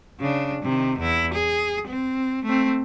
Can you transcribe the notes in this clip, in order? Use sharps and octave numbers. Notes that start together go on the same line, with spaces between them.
C#3 D4
C3 D#3
E2 E4
G#4
C4
A3 C4